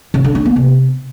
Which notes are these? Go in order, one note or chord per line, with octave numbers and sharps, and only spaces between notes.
C#3
D3
D4
B3
C3